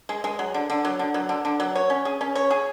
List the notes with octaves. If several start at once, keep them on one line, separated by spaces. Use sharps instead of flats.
G#3
G#3
F#3
D3
D3
F#3
D3
F#3
D3
D3
F#3
C#5
C#4
G#4
C#4
C#5
G#4